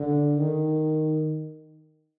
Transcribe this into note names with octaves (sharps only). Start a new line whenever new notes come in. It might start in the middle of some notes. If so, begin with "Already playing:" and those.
Already playing: D3
D#3